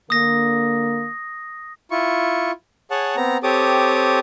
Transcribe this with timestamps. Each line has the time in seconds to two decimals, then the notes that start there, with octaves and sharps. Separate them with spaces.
0.10 D3 A#3 D#6 A#6
1.91 E4 F4 C#6
2.91 G#4 C#5 F#5 A5
3.17 B3 C4 A#5
3.43 C4 G4 A4 C#5 D6 D#6